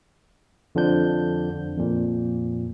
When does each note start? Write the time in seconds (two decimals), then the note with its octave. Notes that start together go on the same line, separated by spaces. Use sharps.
0.75 F2 D3 F3 D4 G6
1.78 F2 A#2